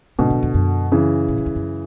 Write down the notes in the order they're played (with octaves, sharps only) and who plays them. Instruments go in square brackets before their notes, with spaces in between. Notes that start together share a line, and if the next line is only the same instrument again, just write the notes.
[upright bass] G#2 [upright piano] B2 D3
[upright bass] F#2
E2
F#2
[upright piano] C#3 E3
[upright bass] A2
F#2
E2
F#2